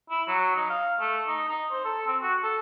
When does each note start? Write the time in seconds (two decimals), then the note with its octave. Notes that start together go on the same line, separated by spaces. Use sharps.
0.10 E4
0.28 F#3
0.56 D#4
0.70 F5
1.00 A3
1.27 D#4
1.49 D#4
1.71 C5
1.85 A4
2.06 C4
2.22 F#4
2.43 A4